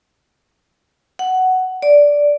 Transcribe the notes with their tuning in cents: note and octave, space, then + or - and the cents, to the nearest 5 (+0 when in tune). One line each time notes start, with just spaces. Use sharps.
F#5 +10
D5 -10